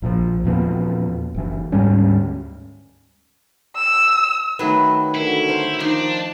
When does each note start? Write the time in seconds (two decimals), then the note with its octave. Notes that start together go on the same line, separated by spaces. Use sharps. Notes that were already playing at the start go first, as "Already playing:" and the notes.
0.02 A#1 A#2 D3 F3
0.44 E2 A#2 F3 B3
1.34 F#1 E3
1.72 D2 G#2 G3 C#4
3.76 E6
4.59 D#3 F#3 A3 B4
5.14 D3 E4 F#4 A#4
5.48 C5 F5
5.80 D#3 F3 D4 D#4